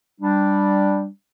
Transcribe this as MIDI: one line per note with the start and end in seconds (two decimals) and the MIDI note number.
0.21 1.07 55
0.21 1.07 62